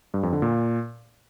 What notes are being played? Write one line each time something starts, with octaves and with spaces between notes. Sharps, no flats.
G2
F2
D3
A#2